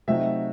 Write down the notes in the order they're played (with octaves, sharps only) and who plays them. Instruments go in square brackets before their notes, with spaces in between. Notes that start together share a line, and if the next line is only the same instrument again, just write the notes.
[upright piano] C3 F#3 A3 D#4 E5